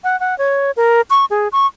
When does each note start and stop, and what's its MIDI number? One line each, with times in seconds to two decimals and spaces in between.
0.04 0.18 78
0.20 0.37 78
0.38 0.71 73
0.77 1.01 70
1.10 1.25 85
1.30 1.48 68
1.52 1.67 85